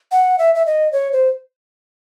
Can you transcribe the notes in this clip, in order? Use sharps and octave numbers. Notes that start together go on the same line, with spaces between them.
F#5
E5
E5
D#5
C#5
C5